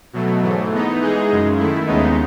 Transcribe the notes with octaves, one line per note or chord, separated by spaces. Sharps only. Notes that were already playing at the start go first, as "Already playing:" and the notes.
B2 F#3 A3
G#2 E3 A3
E3 B3 D#4
E3 G#3 D#4 G#4
F#2 C#3 G#3
D#3 A3 E4
D#2 C#3 G#3 B3 D#4